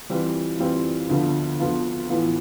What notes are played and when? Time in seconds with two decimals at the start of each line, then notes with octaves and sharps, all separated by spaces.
0.09 E3 G3 C4 F4 B4
0.59 E3 G3 C4 F4 B4
1.09 D2 D3 F3 B3 F4
1.59 D2 D3 F3 B3 F4
2.09 A2 E3 B3 F4